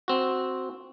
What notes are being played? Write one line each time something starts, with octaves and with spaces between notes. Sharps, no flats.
C4 F#4